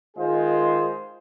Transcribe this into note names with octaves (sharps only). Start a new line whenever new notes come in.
D#3 G#3 F4 G#4 C5